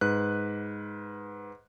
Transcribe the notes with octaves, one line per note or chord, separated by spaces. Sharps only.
G#2 B4 F#6